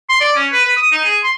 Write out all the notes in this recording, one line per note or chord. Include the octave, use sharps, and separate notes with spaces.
C6
D5
C#4
B4
B4
D#6
D#4
G#4
C6